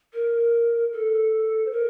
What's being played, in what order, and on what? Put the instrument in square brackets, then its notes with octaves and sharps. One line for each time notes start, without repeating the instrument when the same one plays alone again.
[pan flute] A#4
A4
C5
A#4